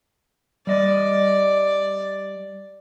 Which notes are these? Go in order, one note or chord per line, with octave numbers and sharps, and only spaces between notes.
G3 D5 D#5